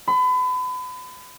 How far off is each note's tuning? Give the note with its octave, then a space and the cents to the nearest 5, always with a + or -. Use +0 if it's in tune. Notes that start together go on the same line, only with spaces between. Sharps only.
B5 +35